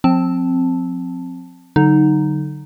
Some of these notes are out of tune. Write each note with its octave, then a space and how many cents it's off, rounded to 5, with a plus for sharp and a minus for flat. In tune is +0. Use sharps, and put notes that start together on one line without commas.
F3 +35 C4 +0 A5 +0
D3 +0 F#3 +30 D#4 -5